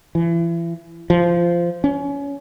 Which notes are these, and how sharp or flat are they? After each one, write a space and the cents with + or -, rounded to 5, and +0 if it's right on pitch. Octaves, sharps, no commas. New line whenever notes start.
E3 +35
F3 -15
C#4 +25